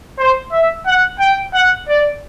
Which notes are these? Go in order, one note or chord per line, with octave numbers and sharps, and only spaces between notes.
C5
E5
F#5
G5
F#5
D5